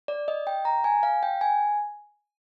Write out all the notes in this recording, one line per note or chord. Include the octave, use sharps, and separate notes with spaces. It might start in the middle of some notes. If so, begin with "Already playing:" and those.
D5
D#5
G5
A#5
G#5
F5
G5
G#5